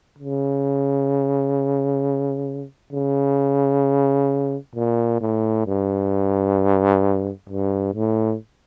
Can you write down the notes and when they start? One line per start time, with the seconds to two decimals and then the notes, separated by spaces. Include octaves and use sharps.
0.18 C#3
2.92 C#3
4.75 A#2
5.21 A2
5.67 G2
7.49 G2
7.94 A2